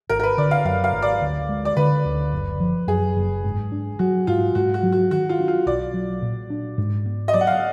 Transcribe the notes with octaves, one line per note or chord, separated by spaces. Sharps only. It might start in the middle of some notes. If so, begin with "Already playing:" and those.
G#1 A#4
A#4
B4
D3 D5
F5
F#2 F5
F5
G#1
D5
D2
G#3
D5
D3 B4
D2
F#1
F3
F#2 G#4
F#1
G#2
D4
F#3 F#4
G#2 F4
G#2 F#4
F#4
F#3
F#4
D#3 F#4
F4
D4
F4
B1 D5
F#3
A#2
D4
G#2
B3
D#5
F#3 D5
F#5
F5